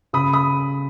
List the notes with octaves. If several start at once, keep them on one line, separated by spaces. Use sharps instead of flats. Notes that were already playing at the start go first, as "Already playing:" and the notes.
C#3 B5 D#6
B5 D#6